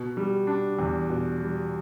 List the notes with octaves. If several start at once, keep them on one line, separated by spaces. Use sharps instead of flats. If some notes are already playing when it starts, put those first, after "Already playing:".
Already playing: B2
G3
D4
E2
B2
G3